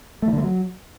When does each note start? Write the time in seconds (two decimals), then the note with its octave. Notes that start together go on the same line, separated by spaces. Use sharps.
0.22 A3
0.28 E3
0.33 D3
0.38 A3
0.43 F#3